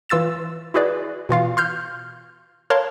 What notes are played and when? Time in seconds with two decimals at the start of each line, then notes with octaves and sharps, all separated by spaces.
0.09 E3 F4 E6 A6 E7
0.74 E4 F#4 G#4 B4 D5
1.29 B2 E3 F4 F5
1.57 C6 F6 G6
2.70 A#4 C#5 F5 A5 C6